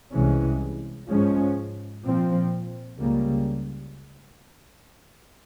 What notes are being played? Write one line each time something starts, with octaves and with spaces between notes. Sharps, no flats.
C2 C3 E3 G#3 C#4
G#2 F3 G#3 C#4
A#2 F3 C4
C#2 C#3 G3 A#3